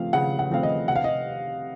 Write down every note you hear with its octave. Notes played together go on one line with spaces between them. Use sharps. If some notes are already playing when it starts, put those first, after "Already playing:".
Already playing: C#3 F3 A3 C4 F5
C#3 F#5
F#5
F3 A3 C4 F5
D#5
C3 F#5
F5
D#5